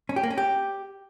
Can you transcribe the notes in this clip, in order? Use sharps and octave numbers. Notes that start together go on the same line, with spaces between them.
C#4
G4
A#3
C#4
G4